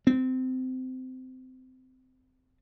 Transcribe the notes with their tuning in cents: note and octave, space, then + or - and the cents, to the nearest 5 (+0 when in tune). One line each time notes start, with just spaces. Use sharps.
C4 -25